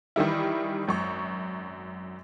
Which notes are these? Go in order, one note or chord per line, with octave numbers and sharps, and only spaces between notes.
D#3 E3 G3 E4
G#1 F#2 C#6